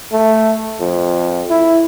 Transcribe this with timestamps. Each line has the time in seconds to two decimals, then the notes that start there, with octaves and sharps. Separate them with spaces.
0.12 A3
0.80 F2
1.50 E4